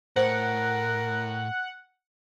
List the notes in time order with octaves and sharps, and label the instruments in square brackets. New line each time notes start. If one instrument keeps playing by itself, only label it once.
[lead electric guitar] A2 [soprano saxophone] A#4 [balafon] C5 [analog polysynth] F#5